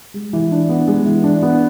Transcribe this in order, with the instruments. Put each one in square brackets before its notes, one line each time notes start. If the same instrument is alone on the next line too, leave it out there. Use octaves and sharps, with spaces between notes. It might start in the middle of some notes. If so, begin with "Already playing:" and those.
[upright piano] G#3
E3
D4
B3
G#3
E3
D4
B3